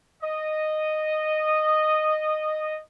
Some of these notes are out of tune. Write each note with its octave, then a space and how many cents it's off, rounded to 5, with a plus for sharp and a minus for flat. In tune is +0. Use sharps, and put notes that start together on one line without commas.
D#5 -10